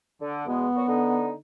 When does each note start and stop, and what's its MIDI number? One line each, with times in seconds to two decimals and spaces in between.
0.21 0.44 50
0.47 0.67 40
0.47 0.67 47
0.47 0.67 56
0.47 1.31 59
0.75 0.83 46
0.75 0.83 54
0.75 0.83 66
0.88 1.33 50
0.88 1.33 63